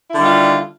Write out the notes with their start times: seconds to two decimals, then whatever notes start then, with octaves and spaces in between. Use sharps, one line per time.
0.09 E4
0.13 D3
0.17 D#3
0.20 G3
0.24 F4